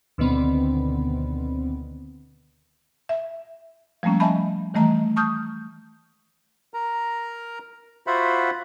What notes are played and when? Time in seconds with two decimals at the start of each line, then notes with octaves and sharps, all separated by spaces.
0.18 D2 B2 D3 D#3 B3 C4
3.09 E5
4.03 F3 G3 A3 A#3 C#4
4.20 D#5 E5 G#5 A5 B5
4.74 D#3 E3 G3 A3 D#5 A#5
5.16 A5 C#6 D#6 F6 G6
6.74 A#4 A#5
8.07 F4 F#4 C5 E5 F#5 B5